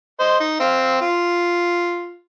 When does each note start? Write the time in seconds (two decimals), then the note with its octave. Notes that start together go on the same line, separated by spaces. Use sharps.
0.20 C5 D#5
0.40 D#4
0.60 C4 F5
1.01 F4